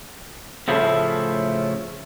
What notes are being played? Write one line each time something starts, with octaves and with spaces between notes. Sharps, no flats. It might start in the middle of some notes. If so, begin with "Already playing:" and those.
A2 C#3 F3 A3 E4